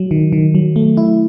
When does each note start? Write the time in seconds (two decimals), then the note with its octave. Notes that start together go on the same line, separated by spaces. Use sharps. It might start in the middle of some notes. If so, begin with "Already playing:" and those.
Already playing: F#3
0.11 D#3
0.33 D#3
0.55 F#3
0.76 A3
0.97 E4